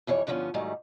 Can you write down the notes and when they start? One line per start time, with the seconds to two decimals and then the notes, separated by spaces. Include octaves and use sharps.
0.07 F2 E3 G3 C#5
0.27 G2 D3 F3 B3 C#4
0.54 G#2 D#3 F#3 G3 A3